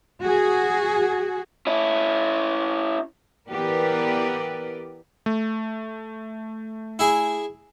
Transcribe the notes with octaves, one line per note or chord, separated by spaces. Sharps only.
F#4 G#4
C#4 E4
E3 B3 G4 A#4 B4 D5
A3
E4 G#4